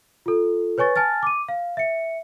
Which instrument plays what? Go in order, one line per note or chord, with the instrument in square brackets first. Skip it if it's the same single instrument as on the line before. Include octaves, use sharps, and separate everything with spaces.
[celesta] F4 A4
B4 C#5 G#5 C#6 A6
G#5 A5 F6 A6
D6 D#7
F5
E5 C#7